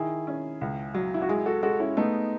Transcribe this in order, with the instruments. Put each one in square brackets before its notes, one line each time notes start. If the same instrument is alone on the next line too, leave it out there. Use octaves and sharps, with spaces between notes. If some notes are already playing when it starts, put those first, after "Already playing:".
Already playing: [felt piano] D#3 [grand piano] E4 G#4
[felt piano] C#4
C#2
F#3
[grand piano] E4
F#4
[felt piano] G#3 [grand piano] E4 G#4
[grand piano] F#4 A4
[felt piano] G#3 [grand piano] F#4 A4
[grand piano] C#4 E4
[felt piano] A3 [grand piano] B3 D#4